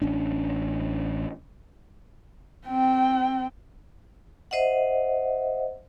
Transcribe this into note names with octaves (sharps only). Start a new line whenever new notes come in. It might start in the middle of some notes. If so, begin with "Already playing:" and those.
A1 C#4 D4
C4 G5
C5 D#5 E5 F#5